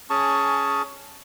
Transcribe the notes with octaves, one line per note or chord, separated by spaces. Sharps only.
C#4 G#4 A5 C#6